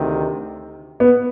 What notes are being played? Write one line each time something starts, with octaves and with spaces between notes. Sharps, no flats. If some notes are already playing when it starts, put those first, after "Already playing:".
Already playing: D2 C3 D#3
B3